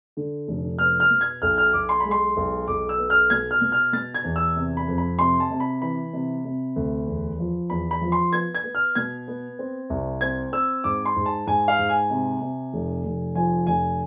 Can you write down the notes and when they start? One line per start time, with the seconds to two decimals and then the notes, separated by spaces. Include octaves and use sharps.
0.17 D3
0.48 F1
0.79 B3 F6
1.00 F6
1.10 B2
1.21 G#6
1.42 B1 F6
1.58 F6
1.73 B1 D6
1.89 C6
2.00 G#3 B5
2.11 C6
2.37 B1
2.68 B1 D6
2.89 E6
2.98 B3
3.10 F6
3.30 B2 G#6
3.51 F6
3.61 B2
3.72 F6
3.93 B2 A6
4.14 G#6
4.24 E2
4.36 E6
4.56 C3
4.77 B5
4.88 F2
4.98 B5
5.18 C3 C6
5.40 A5
5.50 C3
5.60 B5
5.82 E3 B5
6.13 C3
6.45 C3
6.76 D2
7.07 E2
7.38 F3
7.70 E2 B5
7.91 B5
8.01 F3
8.12 C6
8.32 B3 G#6
8.55 G#6
8.64 B3
8.75 F6
8.95 B2 G#6
9.28 B3
9.59 C4
9.90 C2
10.21 C4 G#6
10.52 C4 E6
10.84 G#2 D6
11.05 C6
11.16 G#2
11.26 A5
11.47 G#2 G#5
11.68 F5
11.79 G#2
11.89 G#5
12.10 C3
12.41 C3
12.73 F1
13.05 F1
13.35 F3 G#5
13.67 F1 G#5